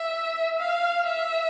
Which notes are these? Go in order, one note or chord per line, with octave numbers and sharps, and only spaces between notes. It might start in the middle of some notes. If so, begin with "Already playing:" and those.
Already playing: E5
F5
E5